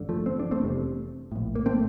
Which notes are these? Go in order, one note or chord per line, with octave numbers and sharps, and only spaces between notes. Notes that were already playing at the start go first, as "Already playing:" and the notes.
Already playing: A1 G2 D3
F3 A3
C4
D4
A3 C4
F1 E2 C3
A#1 A2
A#3
A3 C4